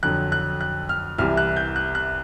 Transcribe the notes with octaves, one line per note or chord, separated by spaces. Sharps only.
F2 D3 F#3 F#6
F#6
F#6
F6
C2 C3 E3 G3 F6
F#6
G6
F#6
F#6